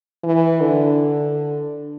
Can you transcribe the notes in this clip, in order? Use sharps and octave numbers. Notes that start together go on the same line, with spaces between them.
E3
D3